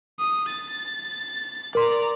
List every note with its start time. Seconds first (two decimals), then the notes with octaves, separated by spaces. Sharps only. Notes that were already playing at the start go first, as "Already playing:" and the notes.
0.19 D#6
0.49 A6
1.75 A#4 D5 A#5 C6